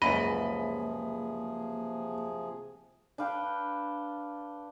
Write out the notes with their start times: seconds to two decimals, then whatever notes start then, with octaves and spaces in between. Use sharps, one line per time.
0.02 C#2 F#2 C3 F3 A#3 G#4 D#5 B5
3.18 D4 B4 F5 G5